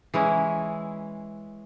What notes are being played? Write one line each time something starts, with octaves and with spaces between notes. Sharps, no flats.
E3 G#3 C#4 E4